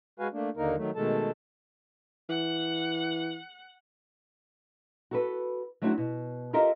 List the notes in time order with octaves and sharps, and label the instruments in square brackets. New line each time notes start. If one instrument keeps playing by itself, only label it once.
[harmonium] G#3 F#4 B4 F5 G#5
A3 A#3 D4
D#2 D3 A#3 D#4 A#4
D#3 F#3 A3
B2 D#3 G#3 A3 A4 A5
[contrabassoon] E3 [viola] F#5
[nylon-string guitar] F#4 A4 B4
F#3 A3 C4 D4 E4 F#4
B2
F4 G4 A4 A#4 D#5 E5